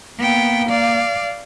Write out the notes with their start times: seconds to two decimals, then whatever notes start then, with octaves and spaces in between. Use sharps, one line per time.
0.18 A#3 B3 G5
0.69 D5 F5